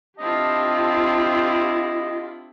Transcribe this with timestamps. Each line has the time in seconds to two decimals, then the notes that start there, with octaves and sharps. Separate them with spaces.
0.19 C4 D4 E4 F4 G4 D#5 A5